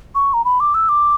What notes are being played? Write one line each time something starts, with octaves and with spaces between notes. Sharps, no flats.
C#6
A#5
B5
D6
E6
D6